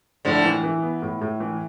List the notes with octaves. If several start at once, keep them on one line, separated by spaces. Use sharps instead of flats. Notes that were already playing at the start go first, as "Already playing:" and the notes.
A2 D3 F3
E3
E3
B3
A2
A2
E3